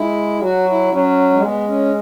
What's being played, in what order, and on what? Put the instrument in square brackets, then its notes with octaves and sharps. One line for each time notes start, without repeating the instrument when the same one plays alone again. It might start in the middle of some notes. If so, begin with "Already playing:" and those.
Already playing: [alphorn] G#3 [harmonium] E4
[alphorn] F#3 [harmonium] F#4
[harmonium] E4
[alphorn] F#3 [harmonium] C#4
[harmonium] G#3
[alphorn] G#3 [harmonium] B3
[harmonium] C#4